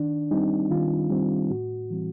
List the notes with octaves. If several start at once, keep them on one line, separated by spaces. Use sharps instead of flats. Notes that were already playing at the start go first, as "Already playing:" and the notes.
Already playing: D#3 D4
G3 C4 D#4
D#3 F4
G3 C4
A2 F#4
E3 G3 C4